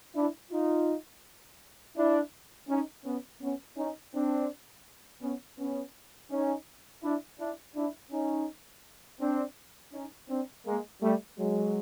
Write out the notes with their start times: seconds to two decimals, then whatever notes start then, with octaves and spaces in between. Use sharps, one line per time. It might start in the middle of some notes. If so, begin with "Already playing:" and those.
0.15 D4 E4
0.51 D#4 F4
1.96 D4 E4
2.69 C#4 D#4
3.04 B3 C#4
3.41 B3 C#4
3.77 C#4 D#4
4.14 C4 D4
5.22 B3 C#4
5.58 B3 C#4
6.30 C#4 D#4
7.03 D4 E4
7.39 D4 E4
7.75 D4 E4
8.12 C#4 D#4
9.20 C4 D4
9.93 C#4 D#4
10.29 C4 D4
10.65 G#3 A#3
11.01 G3 A3
11.38 F#3 G#3